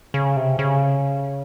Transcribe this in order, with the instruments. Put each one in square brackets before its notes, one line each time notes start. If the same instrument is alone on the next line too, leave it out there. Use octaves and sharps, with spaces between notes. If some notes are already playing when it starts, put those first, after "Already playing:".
[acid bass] C#3
C3
C#3